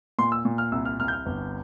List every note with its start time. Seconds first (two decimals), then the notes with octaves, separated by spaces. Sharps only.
0.19 A#2 C6
0.32 E6
0.45 A#2
0.58 F6
0.72 C2 E6
0.85 F6
0.99 C2 F6
1.08 G6
1.13 F6
1.26 G1